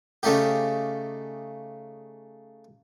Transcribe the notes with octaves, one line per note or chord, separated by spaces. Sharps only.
C#3 A3 D#4 G4